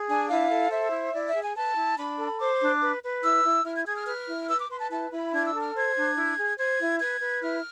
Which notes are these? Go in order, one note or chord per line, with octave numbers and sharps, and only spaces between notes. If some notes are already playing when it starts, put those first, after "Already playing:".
Already playing: G#4
D4 G#5
E4 F5
A4
C5 E5
E4
E4 D5
E5
G#4
G#5
B4 A5
E4
D4 B5
A4
C5 D6
D4
B4
B4
E4 E6
E4
E4 F6
G#6
G#4 G#6
F6
B4 F6
E4
B4 E6
D6
B4 C6
A5
E4 A5
E4 B5
D4 G#6
E6
A4
F6
C5 G#6
D4
E4
G#4
C5 G#6
E4
B4 G#6
B4
E4 F6